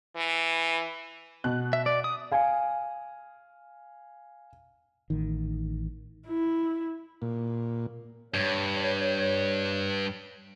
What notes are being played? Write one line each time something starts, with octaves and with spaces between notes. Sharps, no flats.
E3
B2 F#6
E5
D5
D#6
F5 G#5
A1 D#3
E4
A#2
G2 C#5